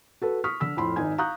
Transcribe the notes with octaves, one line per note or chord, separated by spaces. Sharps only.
F#4 A4 B4
C#6 D#6 F6 B6
D3 E6 B6
F2 A2 B5 C6
G#1 D#4 G#5 G#6
F5 A#5 C#6 D#6 F#6 G6